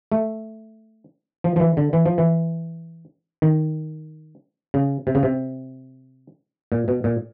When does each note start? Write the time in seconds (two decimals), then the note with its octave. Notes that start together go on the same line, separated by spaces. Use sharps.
0.12 A3
1.44 F3
1.56 F3
1.60 E3
1.77 D3
1.93 E3
2.06 F3
2.18 E3
3.42 D#3
4.74 C#3
5.07 C3
5.15 C#3
5.23 C3
6.72 A#2
6.88 B2
7.04 A#2